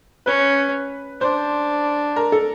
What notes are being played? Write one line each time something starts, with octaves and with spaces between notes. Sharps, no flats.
C#4 B4
D4 C5
A#4
A4